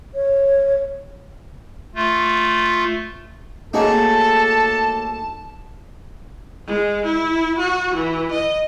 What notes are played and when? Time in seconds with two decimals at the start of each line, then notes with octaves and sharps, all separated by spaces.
0.15 C#5
1.95 A3 F4
3.73 A3 A#3 D#4 F#4 G#4 A4 C#5 A5
6.65 G#3
7.04 E4
7.56 F#4
7.93 E3
8.30 D#5